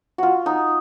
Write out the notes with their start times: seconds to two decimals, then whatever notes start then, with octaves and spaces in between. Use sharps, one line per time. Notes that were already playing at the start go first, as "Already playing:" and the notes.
0.18 F4 F#4
0.46 D#4